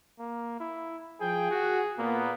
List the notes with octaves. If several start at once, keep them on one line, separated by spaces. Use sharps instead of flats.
A#3
E4
F3 G#4 G5
F#4
A#2 A#3 B3